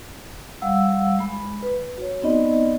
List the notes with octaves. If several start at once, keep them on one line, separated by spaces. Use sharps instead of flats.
G3 F5 F#5 E6
G#3 B5
B4
F#4 C#5
B3 C4 D#4 D5 D#5 B5